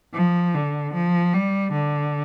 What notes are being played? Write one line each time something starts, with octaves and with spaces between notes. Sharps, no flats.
F3
D3
F3
G3
D3